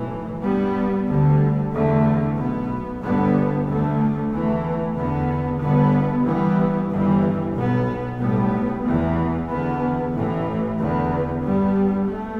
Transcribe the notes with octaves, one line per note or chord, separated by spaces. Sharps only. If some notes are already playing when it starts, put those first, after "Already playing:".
Already playing: B1 A2 E3
G2 G3 B3
D2 D3 G3
E2 D3 A3
B1 B2 B3
G1 G2 D3 G3 B3
D2 D3 A3
E2 E3 A3
E2 D3 B3
G1 G2 D3 B3
G2 E3 G3 B3
G1 G2 E3 G3
B1 B2 B3
B1 A2 G3 B3
E2 E3 B3
E2 D3 B3
A1 A2 E3
E2 D3 B3
G2 G3 B3
A3